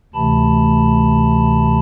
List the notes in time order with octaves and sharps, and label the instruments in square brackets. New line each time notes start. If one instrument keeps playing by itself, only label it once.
[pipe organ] D2 C3 E3 A3 A5 B5